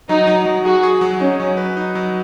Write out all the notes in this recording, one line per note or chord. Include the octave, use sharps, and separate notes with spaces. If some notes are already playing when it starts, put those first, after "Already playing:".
F#3 D#4
F#3
F#3
F#4 G#4
G#4
F#3
C#4 D#4
F#3
B4
D#4
F#3